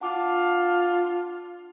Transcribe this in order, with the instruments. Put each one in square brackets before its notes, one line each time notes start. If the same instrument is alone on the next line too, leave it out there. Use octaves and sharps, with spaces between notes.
[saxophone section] D4 F4 [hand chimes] F#5 A5 D6